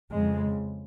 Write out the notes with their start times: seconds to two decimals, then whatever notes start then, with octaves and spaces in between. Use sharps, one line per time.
0.12 F2 C#3 G#3